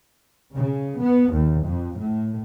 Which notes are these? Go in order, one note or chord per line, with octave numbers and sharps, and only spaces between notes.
C#3
B3
D#2
F2
A2